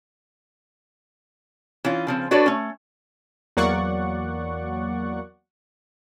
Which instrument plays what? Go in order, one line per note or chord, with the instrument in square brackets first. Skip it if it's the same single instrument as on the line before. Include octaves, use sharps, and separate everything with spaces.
[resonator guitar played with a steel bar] E3 C#4 F4
C#3 F3 C4
D4 F#4 A4 B4 C#5 D5
A3 C#4
[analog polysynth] E2 F#3 A#3 D5 F#5 C#6